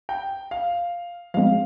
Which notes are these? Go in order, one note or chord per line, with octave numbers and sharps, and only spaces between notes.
G5
F5
F3 G#3 C4 F5